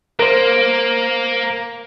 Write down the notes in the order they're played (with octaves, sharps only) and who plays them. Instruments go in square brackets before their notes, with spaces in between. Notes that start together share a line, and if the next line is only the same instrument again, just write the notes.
[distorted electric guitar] A#3 [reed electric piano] A#4 C5